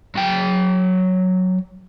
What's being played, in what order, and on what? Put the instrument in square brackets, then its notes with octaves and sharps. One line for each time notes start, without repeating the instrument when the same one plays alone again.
[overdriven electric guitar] F#3 G5